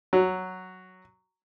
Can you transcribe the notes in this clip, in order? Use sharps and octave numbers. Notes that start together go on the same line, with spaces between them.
F#3